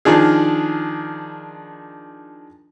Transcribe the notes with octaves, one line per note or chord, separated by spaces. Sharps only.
D#3 F3 D4 G#4